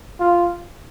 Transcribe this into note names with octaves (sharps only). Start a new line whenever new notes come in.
F4